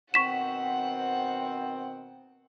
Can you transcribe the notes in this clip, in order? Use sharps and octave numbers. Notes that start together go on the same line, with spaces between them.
B2 D#3 C4 F#5 C#6 B6 E7